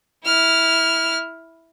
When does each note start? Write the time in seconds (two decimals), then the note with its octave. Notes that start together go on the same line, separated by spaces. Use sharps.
0.25 E4 F6